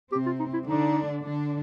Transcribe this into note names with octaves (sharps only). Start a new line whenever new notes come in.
C3 C4 G4
F4
D#4
E4
D3 D4 D#4
D3 D4